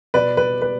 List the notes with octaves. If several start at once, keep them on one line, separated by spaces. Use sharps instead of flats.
B2 B4 D5
B4
B4